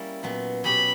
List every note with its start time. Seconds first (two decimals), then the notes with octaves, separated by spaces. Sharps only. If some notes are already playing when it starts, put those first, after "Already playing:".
Already playing: G3 A#3 C#4 E4
0.23 A#2 F#3 B3
0.64 B2 F#3 C#4 G4 B5